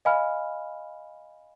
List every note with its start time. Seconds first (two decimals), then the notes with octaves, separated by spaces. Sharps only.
0.05 D#5 F5 G#5 B5 F6